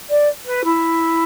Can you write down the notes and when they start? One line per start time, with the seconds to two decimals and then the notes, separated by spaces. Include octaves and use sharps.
0.09 D5
0.46 B4
0.64 E4